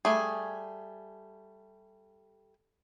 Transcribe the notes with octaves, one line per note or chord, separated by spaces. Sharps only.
G3 A3 G#4